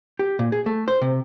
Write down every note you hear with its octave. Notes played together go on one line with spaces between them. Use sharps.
G4
A#2
G#4
A3
C5
C3